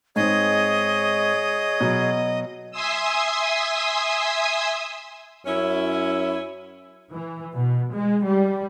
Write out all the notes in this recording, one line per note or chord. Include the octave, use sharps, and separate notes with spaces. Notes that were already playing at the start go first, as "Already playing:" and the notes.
G#2 C4 G#4 C#5 D#5
B2 F#3
E5 G#5 C6 D#6 E6
F#2 C#4 E4
E3
B2
G#3
G3